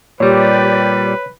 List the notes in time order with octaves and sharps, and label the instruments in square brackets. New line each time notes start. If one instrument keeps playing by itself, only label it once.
[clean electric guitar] A#2 G3 [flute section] G4 D5 [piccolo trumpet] B4 [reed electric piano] C#5